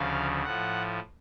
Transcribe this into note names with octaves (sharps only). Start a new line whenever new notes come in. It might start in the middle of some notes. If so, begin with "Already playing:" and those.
Already playing: D2 C#3 F3 F5
A2 F3 F#5